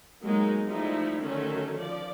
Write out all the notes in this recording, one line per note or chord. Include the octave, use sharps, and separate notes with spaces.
F#3 G#3 A#3 B3 D#4
F3 G3 A3 D#4 E4
D3 D#3 F#3 A3 C#4 A4
F3 D5